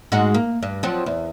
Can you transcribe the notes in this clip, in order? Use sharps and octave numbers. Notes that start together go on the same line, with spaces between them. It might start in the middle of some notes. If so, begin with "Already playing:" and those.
G#2 G#3 F#4
A#3
G2
F3 F#3 C4
E2